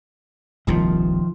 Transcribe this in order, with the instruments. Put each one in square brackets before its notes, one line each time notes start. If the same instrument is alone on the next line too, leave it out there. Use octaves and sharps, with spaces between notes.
[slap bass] D#1 C2 A#2 [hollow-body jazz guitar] D#3 F3